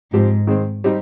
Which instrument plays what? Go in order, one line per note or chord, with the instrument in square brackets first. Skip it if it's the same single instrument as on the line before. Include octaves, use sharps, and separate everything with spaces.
[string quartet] G#2 [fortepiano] F3 C4 G4
[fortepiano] D#3 G#3 C4
G3 C4 D#4 G4